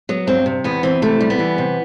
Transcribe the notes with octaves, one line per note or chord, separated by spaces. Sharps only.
F#3 B3
G2 C4
C3
E2 B3
E3 C4
C3 A3
G3
B3
E3
C3